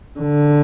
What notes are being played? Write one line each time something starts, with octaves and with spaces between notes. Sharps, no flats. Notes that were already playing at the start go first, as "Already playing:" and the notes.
D3